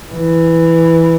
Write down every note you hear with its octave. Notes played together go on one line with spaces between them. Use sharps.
E3